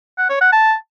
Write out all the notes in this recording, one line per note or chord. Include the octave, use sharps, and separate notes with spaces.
F#5
C#5
F#5
A5